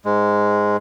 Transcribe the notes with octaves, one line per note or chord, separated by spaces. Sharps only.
G#2 G#3